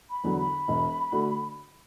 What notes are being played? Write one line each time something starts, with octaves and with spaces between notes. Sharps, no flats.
B5
E2 D3 F#3
B5
E1
D3 A3 F#4